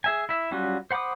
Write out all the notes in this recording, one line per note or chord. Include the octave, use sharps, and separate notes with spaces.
G#4 E5 G#5
E4 E5
F#3 G3 C#4 F4 F#4
C5 F#5 B5 D6 D#6